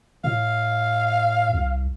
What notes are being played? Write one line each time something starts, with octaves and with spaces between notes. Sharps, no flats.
A2 F5
C2